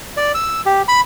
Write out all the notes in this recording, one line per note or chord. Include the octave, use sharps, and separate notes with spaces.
D5
E6
G4
B5